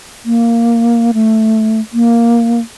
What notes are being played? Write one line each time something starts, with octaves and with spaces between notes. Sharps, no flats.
A#3
A3
A#3